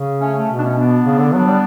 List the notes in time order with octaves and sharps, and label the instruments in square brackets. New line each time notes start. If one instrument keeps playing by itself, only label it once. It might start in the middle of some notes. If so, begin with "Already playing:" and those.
Already playing: [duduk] C#3
[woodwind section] A3 C#4
A3 C#4
[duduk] B2
[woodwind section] D4
A3 C#4
B3 D4
[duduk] C#3
D3
[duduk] F#3 [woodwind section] B3 D4
[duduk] G3